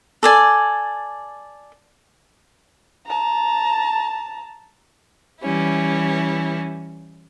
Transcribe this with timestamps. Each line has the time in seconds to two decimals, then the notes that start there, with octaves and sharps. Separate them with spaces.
0.23 A4 D5 G#5
3.06 A5 A#5
5.41 E3 G3 C#4 E4